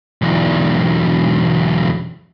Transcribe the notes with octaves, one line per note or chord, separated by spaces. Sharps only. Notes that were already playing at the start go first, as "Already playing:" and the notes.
B1 E2